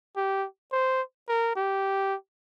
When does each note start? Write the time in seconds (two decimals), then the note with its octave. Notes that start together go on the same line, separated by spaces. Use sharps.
0.17 G4
0.72 C5
1.29 A#4
1.56 G4